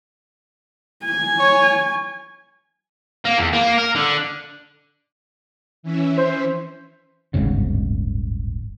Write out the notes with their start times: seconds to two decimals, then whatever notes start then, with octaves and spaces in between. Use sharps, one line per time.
1.05 G#5
1.39 C#5
3.25 A#3
3.38 E2
3.53 A#3
3.78 A#4
3.95 D3
5.83 E3 C#4 E4
6.17 C5
7.34 D1 G1 G#2 C#3